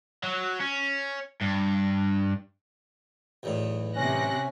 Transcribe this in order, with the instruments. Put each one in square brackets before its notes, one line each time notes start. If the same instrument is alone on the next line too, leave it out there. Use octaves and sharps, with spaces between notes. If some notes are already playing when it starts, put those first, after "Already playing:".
[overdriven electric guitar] F#3
C#4
G2
[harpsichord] B1 E2 A2
[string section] C3 F#6 A#6 [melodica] C#4